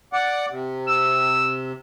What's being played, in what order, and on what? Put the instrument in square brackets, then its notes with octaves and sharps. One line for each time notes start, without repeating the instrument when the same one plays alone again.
[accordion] D5 F#5
C3
[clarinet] E6